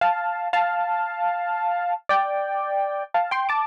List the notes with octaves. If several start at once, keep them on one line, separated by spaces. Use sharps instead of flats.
F5 A5
F5 A5
D5 G5
F5 A5
G5 C6
A5 D6